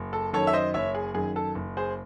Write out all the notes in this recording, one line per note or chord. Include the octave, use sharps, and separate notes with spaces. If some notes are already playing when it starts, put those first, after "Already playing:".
Already playing: F#1
A4
F#2 D#3 A4 C#5
E5
C5 D#5
F#1 C#5 E5
G#4
F#2 D#3 G#4
A4
F#1
G#4 C5